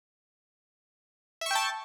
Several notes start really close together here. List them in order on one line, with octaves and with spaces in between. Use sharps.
E5 C#6 G5 A5